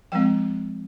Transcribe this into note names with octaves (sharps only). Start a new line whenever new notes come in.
F3 G#3 C4 G5